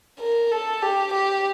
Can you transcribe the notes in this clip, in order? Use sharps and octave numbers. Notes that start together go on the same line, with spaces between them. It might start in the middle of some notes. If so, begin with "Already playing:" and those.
A#4
A4
G4
G4